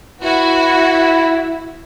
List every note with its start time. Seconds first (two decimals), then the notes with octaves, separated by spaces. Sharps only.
0.22 E4 F#4 B4